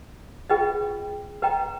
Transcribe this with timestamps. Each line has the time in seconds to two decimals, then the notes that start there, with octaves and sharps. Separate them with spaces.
0.50 F4 G#4 B4 D#5 G5
1.42 B4 D#5 G5 A#5